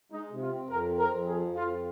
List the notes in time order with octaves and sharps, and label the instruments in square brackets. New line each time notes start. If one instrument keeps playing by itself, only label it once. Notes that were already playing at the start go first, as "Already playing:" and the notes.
[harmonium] G#3 [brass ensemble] D#4
[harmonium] C3
[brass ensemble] F4
[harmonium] C4
[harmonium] F2 [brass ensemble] A#4
[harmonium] C4
[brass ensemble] A#4
[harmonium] F2
[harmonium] F3 [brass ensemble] G#4
[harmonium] F2
[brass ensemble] F4
[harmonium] C4